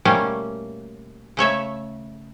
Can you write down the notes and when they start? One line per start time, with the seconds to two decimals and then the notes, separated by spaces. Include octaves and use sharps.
0.05 B2 G3 A3 A#3 C#4
1.37 C#3 A3 C#5 E5